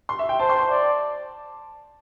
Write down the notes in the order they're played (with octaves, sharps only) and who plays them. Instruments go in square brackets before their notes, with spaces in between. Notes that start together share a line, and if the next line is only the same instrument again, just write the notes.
[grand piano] C6
E5
G5
[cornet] C5 [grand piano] A5
[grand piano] C6
A5
[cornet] D5